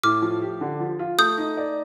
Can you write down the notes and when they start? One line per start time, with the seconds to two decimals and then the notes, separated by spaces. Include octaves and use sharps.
0.03 A2 D6 F6
0.22 F3
0.42 G4
0.61 D3
0.80 F3
0.99 F4
1.18 A3 D#6 G6
1.38 D#4
1.57 D5